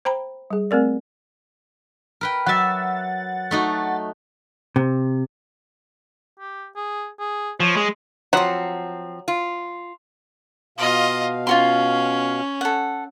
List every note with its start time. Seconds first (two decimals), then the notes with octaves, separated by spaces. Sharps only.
0.05 C5 G5 A#5 B5
0.50 G3 G#4
0.71 A3 C4 A#4 D5
2.21 A#4 B4 G5
2.46 F#3 E5 F#5 A6
3.51 A3 D#4 F#4
4.76 C3
6.40 G4
6.76 G#4
7.19 G#4
7.60 F3 C#5
7.76 G#3
8.33 F3 F#3 C4 F#5
9.28 F4
10.78 B2 F4 D#5 F5
11.47 C#4 F4 F#4 C6
12.61 A4 F#5